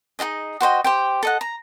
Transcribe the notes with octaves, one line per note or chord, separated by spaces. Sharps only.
D#4 F#4 G#4 D#5
F#4 C5 D#5 G5
G4 C5 G5
A4 D#5 F#5
A#5